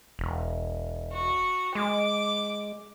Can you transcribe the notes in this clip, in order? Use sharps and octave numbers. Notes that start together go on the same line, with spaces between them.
E1
F#4
G#3 D6